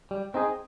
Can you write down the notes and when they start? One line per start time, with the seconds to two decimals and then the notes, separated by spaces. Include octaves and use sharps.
0.11 G3
0.34 C4 D#4 G#4